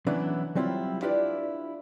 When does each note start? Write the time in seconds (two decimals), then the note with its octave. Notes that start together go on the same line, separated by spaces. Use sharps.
0.07 E3 F#3 B3 C#4 D4 E4
0.55 F#3 G3 C4 C#4 E4 F4
1.02 D4 E4 F4 G4 B4 D5